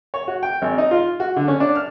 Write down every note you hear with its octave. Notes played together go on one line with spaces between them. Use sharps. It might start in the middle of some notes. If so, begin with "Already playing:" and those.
C#5
F#4
G5
G#1
D#4
F4
F#4
D3
C#4
D4
F6